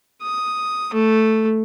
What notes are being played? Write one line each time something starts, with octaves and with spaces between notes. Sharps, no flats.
D#6
A3